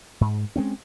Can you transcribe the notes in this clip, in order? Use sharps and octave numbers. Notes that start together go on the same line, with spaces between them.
G#2
G#3 A3 C4 C#4